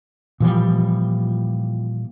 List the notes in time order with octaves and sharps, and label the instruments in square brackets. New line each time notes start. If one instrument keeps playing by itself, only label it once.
[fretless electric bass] A#2 E3 F3 G3